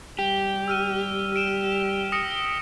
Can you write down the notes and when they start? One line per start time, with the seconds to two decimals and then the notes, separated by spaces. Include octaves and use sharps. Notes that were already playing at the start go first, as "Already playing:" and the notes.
0.19 G3 G4
0.68 E6 F6 D#7
1.36 D7 E7
2.12 D#6 A#6 C#7